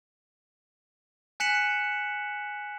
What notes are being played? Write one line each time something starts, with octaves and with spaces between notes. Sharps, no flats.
G#5 F#6 B6 C#7 E7 F#7